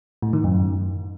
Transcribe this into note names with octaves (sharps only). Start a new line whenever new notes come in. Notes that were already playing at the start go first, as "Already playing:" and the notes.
A2
D#3
F#2